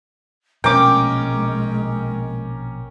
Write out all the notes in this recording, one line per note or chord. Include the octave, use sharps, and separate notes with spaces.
A#1 B2 G#3 A3 C#4 A#4 G5 D6